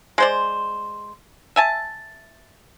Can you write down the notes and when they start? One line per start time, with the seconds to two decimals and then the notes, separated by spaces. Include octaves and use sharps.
0.18 G#3 C5 D5
1.56 E5 G#5 A5